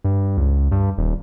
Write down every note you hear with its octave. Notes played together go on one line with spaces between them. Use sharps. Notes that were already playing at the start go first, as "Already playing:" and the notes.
G2
C#2
G2
D#1